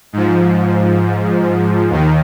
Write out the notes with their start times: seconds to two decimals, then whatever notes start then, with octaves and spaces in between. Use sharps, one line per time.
0.13 G#2 F3
1.90 D#2 D#3